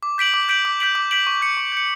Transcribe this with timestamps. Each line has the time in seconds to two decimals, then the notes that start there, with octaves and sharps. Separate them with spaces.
0.03 D6
0.18 G6 B6 D7 F#7
0.34 D6
0.49 G6 B6 D7 F#7
0.65 D6
0.80 G6 B6 D7 F#7
0.95 D6
1.11 G6 B6 D7 F#7
1.27 C#6
1.42 G6 C#7
1.57 C#6
1.72 G6 C#7